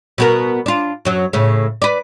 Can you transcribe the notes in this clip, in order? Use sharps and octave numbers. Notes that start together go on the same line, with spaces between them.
B2 B3 A#4
D4 F4
F#2 F#3
A2 C#3
B4 D5